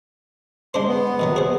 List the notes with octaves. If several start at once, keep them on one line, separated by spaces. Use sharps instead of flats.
G#3 D4 C5 C6
B3
B2 D#3 F#3
G#4 C5